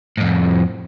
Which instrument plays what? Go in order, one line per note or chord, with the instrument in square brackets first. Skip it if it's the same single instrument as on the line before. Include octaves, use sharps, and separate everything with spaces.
[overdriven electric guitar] F2 A2